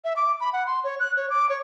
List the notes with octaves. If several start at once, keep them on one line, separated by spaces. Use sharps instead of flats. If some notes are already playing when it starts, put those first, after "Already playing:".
E5
D6
B5
F#5
C6
C#5
F#6
C#5
D6
C#5